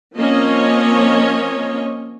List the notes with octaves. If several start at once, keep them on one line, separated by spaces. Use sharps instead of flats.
F3 A#3 C4 C#4 C#5 D#5